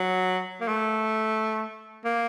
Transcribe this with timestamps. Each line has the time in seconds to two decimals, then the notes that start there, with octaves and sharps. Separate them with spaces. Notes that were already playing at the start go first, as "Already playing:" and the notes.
Already playing: F#3
0.61 A#3
0.68 A3
2.05 A#3